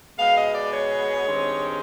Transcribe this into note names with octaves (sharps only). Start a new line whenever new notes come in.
B2 G#3 B3 F5
D#5
D5
C#5
G2 D#3 G#3 C4 D#4